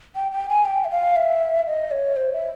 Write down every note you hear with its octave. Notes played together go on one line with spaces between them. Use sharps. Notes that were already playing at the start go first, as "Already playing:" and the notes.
G5
G5
G#5
G5
E5
F5
E5
D#5
C#5
C5
E5